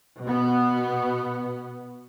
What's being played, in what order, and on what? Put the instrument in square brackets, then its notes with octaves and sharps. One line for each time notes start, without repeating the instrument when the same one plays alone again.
[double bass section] B2 B3